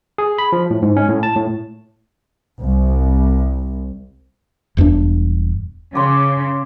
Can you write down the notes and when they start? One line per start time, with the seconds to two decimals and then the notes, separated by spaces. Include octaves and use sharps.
0.18 G#4
0.38 B5
0.52 F3
0.70 A2
0.82 G#2
0.97 C#4
1.08 A2
1.23 A5
1.36 A2
2.62 C2
4.77 E1 E2 G2 D4
5.95 C#3 C#5 C6 D6